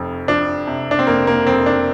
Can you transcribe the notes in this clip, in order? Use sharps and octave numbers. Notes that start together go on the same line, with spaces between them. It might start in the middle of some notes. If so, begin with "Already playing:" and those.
Already playing: F1 F2
F3 D4
C3
D4
C4
F1 A#3
A#3
F2 C4
D4